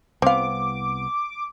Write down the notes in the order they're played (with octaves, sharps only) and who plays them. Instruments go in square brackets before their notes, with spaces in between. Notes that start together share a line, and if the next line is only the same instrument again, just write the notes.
[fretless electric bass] C2 B3 [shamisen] C4 F5 [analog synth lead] D6